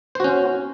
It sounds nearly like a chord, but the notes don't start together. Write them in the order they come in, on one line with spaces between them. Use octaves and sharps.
C5 F#4 C#4